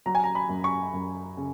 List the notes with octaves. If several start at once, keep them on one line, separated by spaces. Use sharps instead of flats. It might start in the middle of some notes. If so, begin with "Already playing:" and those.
F#3 A#5
G#5
A#5
B5
F#2
C#6
F#2
C#3